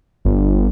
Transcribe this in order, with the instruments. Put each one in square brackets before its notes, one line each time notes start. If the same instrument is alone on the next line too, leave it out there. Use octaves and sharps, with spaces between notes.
[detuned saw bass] G1